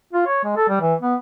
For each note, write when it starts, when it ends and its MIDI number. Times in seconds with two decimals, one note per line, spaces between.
0.13 0.26 65
0.27 0.41 73
0.44 0.53 56
0.56 0.67 69
0.69 0.80 55
0.81 0.94 52
1.02 1.15 59